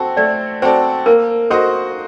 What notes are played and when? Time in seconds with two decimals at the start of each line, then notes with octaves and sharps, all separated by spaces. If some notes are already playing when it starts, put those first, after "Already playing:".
Already playing: C4 F#4 A4
0.17 A3 D5
0.62 C4 F#4 A4 C5 D5
1.06 A#3 A#4
1.50 F#4 A4 C5 D#5